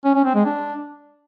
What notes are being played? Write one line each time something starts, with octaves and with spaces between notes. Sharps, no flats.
C#4
C#4
C4
G#3
D4